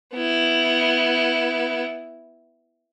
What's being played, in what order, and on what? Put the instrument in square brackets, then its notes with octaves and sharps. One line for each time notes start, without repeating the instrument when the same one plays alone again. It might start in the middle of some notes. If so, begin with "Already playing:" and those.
[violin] B3 E4